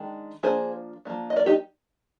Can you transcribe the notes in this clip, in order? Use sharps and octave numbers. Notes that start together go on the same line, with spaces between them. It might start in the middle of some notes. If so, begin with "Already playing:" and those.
Already playing: D#3 G#3 D4
F3 A#3 D4 G#4 C5
F3 A#3 D4
D#5
A#4 D5
D#4 G4